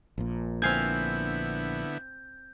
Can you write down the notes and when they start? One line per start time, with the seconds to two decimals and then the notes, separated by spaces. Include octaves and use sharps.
0.18 A#1 A#2
0.62 D3 B3 C4 E4 F5 G#5 G6